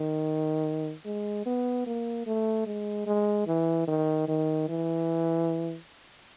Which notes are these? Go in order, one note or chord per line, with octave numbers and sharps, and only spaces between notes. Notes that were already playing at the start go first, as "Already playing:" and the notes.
Already playing: D#3
G#3
B3
A#3
A3
G#3
G#3
E3
D#3
D#3
E3